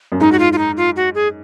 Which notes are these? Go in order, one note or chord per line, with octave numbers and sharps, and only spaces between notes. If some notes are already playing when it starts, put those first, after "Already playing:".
F#2
G#2 D#4
F#4
F4
F4
D#4
F4
F#4
G#4